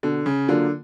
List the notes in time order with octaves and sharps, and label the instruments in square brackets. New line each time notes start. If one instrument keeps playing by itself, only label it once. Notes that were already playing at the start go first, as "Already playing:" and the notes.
[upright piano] B2 [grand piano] D3
[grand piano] C#3
[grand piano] D3 [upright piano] F#3 A#3 D4 F4